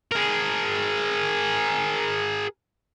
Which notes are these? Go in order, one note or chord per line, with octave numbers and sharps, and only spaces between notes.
G#4 A#4